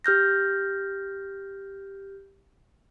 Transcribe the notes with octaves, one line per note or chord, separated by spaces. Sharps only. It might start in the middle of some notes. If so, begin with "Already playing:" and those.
G4 F6 G6 A#6